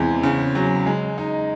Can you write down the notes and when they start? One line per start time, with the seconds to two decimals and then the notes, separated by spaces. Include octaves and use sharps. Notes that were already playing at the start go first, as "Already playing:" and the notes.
Already playing: E2 C3 G#3 C4
0.23 C#3
0.55 F#3
0.86 G#3
1.18 D#4